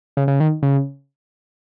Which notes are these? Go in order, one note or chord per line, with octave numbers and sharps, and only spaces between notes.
C#3
C#3
D#3
C#3